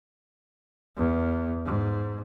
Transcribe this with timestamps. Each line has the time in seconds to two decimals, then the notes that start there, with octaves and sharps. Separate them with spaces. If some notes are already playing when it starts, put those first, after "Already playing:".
0.97 E2
1.65 G#2